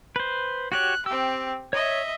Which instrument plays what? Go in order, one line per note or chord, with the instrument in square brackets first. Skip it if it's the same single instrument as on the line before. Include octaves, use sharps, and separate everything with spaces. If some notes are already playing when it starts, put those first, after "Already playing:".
[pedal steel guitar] B4 C5
[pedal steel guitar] F#4 G4 C#5 [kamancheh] F#6
[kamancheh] C4 G4 [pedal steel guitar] E6
[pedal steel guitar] C#5 [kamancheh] D#5 E5